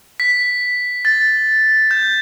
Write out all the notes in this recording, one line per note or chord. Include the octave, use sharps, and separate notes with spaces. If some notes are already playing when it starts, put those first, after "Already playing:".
B6
A6
G6